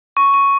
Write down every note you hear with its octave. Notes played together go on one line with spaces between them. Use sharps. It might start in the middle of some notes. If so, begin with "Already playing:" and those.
C#6
C#6